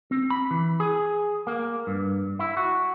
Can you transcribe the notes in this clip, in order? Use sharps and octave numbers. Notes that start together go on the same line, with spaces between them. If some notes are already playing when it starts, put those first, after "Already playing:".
C4
B5
E3
G#4
A#3
G2
E4
F#4